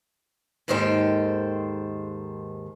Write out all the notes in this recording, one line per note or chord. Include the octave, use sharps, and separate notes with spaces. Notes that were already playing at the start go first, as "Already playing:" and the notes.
D#2 G#2 D#3 A4 C5 G5